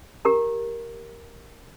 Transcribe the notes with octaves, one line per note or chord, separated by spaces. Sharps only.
G4 A#4 A#5